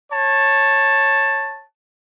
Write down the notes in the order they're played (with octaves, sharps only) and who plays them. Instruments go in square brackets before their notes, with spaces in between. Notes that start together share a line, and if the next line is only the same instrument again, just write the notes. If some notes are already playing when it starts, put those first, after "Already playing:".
[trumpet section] C#5 A5